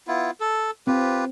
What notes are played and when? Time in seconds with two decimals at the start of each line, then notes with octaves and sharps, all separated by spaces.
0.07 B3 E4 F4
0.40 A4
0.87 C4 F4 G4 B4